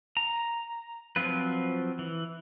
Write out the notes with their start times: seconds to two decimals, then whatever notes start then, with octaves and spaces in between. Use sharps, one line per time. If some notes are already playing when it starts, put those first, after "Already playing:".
0.17 A#5
1.16 F3 F#3 C4 F4 B4
1.99 E3